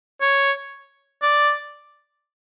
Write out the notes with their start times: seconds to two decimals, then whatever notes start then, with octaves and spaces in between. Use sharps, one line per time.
0.21 C#5
1.22 D5